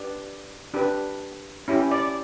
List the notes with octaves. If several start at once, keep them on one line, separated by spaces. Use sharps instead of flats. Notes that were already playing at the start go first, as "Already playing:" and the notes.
Already playing: D4 G4 B4 D5
D4 G4 B4
C#4 E4 G4
D5